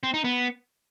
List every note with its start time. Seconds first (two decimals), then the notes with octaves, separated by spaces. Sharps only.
0.03 C4
0.14 D#4
0.24 B3